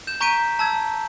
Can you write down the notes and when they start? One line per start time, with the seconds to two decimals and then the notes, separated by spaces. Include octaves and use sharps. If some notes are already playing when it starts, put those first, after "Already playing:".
0.07 G6 E7
0.21 A#5 C#6 G6 B6 D7 D#7
0.59 A5 E6 G#6